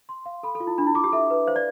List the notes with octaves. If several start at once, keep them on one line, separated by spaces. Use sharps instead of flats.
C6
F5
A4 B5
A4
F4
E4
D4 B5
E4
F4 D6
G4
A4 E5
B4
C5 F5
D5